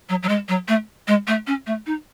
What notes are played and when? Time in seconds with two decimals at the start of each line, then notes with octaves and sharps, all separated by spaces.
0.09 F#3
0.23 F#3
0.29 G#3
0.49 F#3
0.68 A3
1.08 G#3
1.27 A3
1.47 C#4
1.67 A3
1.86 D#4